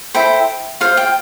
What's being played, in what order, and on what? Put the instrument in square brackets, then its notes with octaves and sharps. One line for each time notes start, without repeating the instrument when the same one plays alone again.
[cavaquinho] E4 A4 C5 G5
F4 C5 F5
G5